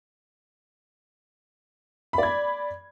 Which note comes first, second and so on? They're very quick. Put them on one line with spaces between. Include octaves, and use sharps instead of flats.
B5 D5 G#6